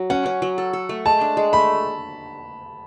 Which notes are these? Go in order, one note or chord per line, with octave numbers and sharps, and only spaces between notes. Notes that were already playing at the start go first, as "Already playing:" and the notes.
Already playing: F#3
C#4 F#5
C#4
F#3
A4
A4
A3
G#3 A5
D4
G#3
A3 B5